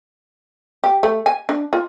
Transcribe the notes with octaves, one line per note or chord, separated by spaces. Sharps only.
G4
A3
G#5
D4
F4